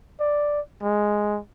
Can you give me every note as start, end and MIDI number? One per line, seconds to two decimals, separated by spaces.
0.20 0.61 74
0.83 1.40 56